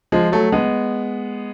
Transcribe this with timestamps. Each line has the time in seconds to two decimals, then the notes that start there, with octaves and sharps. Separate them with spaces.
0.12 F3 G#3
0.32 F#3 A3
0.52 G#3 B3